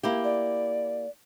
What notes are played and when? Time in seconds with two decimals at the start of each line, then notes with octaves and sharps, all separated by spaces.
0.03 A#3 E4 G4
0.24 D5